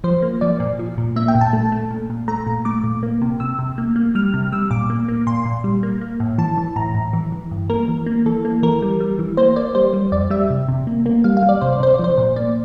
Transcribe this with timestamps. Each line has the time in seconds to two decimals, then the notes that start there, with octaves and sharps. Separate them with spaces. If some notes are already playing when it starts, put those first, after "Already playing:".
0.04 F3 C5
0.22 A#3
0.41 F3 D5
0.60 A#2
0.79 F3
0.98 A#2
1.16 A#3 E5
1.28 G5
1.35 A#2
1.41 A5
1.53 A3
1.72 A3
1.91 A#2
2.10 A#2
2.28 A3 A#5
2.47 A#2
2.65 A3 D6
2.84 A#2
3.03 A#3
3.22 C3
3.40 C3 E6
3.59 C3
3.78 A#3
3.96 A#3
4.15 G3 F6
4.34 C3
4.52 G3 E6
4.71 A#2 D6
4.90 A#3
5.08 A#3
5.27 A#2 C6
5.46 A#2
5.64 G3
5.83 A#3
6.01 A#3
6.20 A2
6.38 E3 A5
6.58 E3
6.76 A2 A#5
6.95 A2
7.13 E3
7.32 E3
7.51 G2
7.70 A#3 A#4
7.88 E3
8.06 A#3
8.26 E3 A4
8.45 A#3
8.63 E3 A#4
8.82 G3
9.00 G3
9.19 E3
9.37 A#3 C5
9.56 A#3 D5
9.75 G3 C5
9.94 G3
10.12 F2 D5
10.30 G3 E5
10.50 C3
10.68 C3
10.87 A#3
11.06 A#3
11.24 G3 F5
11.37 F5
11.43 G3
11.49 D5
11.61 C3 C5
11.73 D5
11.80 C3 C5
11.94 D5
11.99 F3 C5
12.18 A#2
12.36 A#3 D5